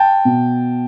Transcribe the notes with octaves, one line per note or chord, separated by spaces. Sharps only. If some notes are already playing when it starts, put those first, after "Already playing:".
Already playing: G5 A5
B2